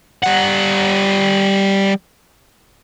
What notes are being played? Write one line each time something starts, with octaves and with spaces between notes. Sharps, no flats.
G3 F#5